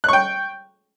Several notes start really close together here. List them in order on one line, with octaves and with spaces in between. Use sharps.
F#6 C#6 G5